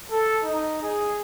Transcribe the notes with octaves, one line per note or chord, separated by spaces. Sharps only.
A4
D#4
G#4